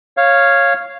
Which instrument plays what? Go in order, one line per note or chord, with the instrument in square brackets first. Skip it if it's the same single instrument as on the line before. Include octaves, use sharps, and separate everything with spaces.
[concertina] C#5 F5